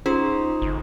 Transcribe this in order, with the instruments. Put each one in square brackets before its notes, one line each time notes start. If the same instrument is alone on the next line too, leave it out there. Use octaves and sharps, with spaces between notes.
[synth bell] C#4 F4 G#4 [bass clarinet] D#4 [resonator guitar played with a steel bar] C5
[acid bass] G1